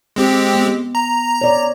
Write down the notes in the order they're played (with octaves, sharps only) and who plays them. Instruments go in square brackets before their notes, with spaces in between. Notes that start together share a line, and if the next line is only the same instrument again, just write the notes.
[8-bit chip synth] G#3 C4 G4
[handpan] B3
[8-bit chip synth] A#5
[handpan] C#5 D5